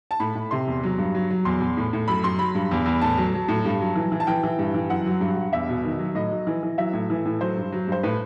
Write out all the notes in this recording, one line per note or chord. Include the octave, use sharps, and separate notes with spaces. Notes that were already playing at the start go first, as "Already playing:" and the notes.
A5
A2 B5
A2
C3 C6
E2
F#3
G2
F#3
F#3
E2 C6
E2
A2
A2
F#2 B5
F#2 C6
F#3 B5
G2
E2
E2
A2 A5
F#3
F#3
A2
G2
F#3
E3
E3
A5
E3 G5
E3
G2
E3
F#2 F#5
F#3
G2
G2
E2 E5
B2
D#3
F#3
A2 D#5
F#3
E3
E3
F#3 E5
A2
E3
A2
F#3 C5
G2
F#3
G2 C5
A2 B4